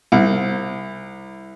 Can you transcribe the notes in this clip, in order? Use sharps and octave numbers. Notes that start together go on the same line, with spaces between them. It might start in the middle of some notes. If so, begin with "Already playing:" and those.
C2